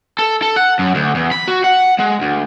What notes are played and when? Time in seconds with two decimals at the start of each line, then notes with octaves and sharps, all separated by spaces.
0.19 A4
0.42 A4
0.56 F#5
0.79 F#2
0.95 D2
1.15 E2
1.32 B5
1.48 F#4
1.64 F#5
2.00 G#3
2.22 D2